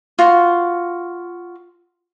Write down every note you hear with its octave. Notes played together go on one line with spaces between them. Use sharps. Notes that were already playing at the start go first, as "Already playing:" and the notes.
F4 F#4